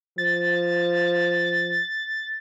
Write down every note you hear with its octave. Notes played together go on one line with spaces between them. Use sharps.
F3 A6